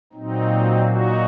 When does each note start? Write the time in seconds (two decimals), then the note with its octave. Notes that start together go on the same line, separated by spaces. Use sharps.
0.13 A#2 F#3 C4 D#4
0.86 D#4 F#4